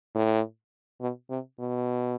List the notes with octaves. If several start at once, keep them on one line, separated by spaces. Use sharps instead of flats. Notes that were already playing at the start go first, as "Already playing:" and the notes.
A2
B2
C3
B2